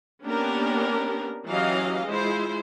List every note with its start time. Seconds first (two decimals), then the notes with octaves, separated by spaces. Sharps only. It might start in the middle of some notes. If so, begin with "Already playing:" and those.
0.23 A#3 B3 C#4 D4 G4 A#4
1.47 E3 F#3 C#4 G4 D#5 F5
2.07 G#3 E4 F4 C5